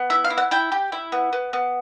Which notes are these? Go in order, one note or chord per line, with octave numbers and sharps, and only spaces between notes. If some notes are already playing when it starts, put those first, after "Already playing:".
Already playing: B3
E4 E5
F5
E4
F#5
E4 G5
G4
E4
B3
B3
B3